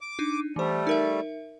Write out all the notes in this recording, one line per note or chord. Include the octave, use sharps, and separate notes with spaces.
D6
D4 D#4 D#7
E3 G3 A3 C5
D#4 A#4 E5